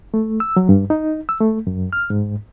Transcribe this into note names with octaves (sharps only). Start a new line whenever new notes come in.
A3
E6
F#3
G2
D#4
E6
A3
F#2
F6
G#2